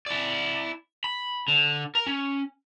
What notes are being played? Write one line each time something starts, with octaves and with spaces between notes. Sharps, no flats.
E4 D5
B5
D3
A#4
C#4